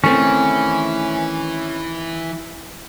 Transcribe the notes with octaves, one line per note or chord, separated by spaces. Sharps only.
D#3 E3 A3 C4 C#4